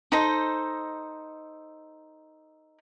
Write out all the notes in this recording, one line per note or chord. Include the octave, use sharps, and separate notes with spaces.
D#4 A4 C5 D#5